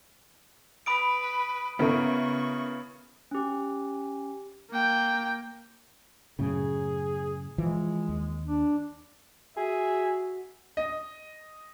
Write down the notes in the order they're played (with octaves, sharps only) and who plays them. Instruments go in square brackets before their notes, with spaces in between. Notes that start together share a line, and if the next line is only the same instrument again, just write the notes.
[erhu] B4 [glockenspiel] B5 D#6 D7
[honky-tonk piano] C#3 E4 A#4 [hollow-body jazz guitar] B3 [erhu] C#6
[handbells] C#4 G4
[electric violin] A#3 G5
[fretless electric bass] F#2 A2 C#3 [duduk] G#4
[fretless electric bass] E3 F3 [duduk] G#3
[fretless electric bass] D#2
[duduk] D4
[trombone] F#4 [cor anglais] G#4 [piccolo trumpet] E5
[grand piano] D#5